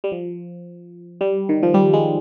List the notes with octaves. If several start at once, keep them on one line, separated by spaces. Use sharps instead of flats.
G3
F3
G3
D#3
F3
G3
G#3